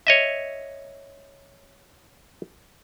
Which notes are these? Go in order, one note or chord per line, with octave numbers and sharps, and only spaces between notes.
C#5 D#5 E5